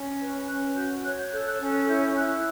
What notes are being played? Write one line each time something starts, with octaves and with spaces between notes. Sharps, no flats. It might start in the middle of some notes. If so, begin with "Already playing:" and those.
Already playing: C#4
B4
C#4 F#6
F#4 G6
C#5 F#6
G6
A4 G6
F#6
C#4
E4 G6
E4 F#6